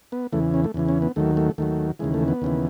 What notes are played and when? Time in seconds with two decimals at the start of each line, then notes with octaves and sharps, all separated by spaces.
0.12 B3
0.32 E2 C#3 E3 A3
0.54 C#4
0.64 A3
0.74 E2 C#3 E3
0.89 C#4
1.02 B3
1.16 D#2 D#3 F#3 A3
1.37 A3
1.58 D#2 D#3 F#3 A3
1.99 D#2 C#3 E3 G#3
2.14 A3
2.28 B3
2.42 D#2 C#3 E3